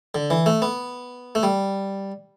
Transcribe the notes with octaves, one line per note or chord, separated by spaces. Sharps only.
D3
E3
A3
B3
A3
G3